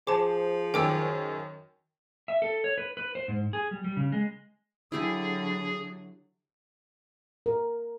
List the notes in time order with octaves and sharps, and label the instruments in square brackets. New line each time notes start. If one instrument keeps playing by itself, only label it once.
[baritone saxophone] F3 [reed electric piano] G#4 C5 [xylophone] A5 D6
[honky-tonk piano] F#2 D#3 [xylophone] G5 D6 E6
[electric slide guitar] E5
A4
C#5
B4
B4
C5
G#2
G#4
G3
G3
C#3
G#3
[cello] D3 F#3 [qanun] E4 G4 G#5 [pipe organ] G#4
[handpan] A#4